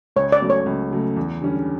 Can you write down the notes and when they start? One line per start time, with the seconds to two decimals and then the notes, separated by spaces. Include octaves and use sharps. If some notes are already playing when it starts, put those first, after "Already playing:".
0.16 C#2 C#5
0.32 D5
0.41 C#3 F#3 A3
0.50 C#5
0.66 C#2
0.91 C#3 F#3 A3
1.16 E2
1.42 D3 G3 C#4